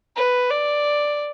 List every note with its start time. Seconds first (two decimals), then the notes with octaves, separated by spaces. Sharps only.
0.16 B4
0.50 D5